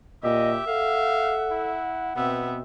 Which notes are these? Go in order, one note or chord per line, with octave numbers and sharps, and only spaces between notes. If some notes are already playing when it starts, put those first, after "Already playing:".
A#2 G4 D#5 E5
A4 F5 F#5
E4
B2 B3 C4 E5